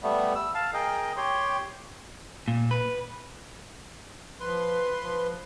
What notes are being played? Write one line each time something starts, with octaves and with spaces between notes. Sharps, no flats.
G3 A3 B3
E6
F5 A5
G#4 A#4 D#5 G5
G4 C#5 G5 C6
A#2
B4
F3 B4 C6
F3